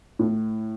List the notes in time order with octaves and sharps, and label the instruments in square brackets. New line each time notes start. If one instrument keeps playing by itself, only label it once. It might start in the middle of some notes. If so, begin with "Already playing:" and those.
[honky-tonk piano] A2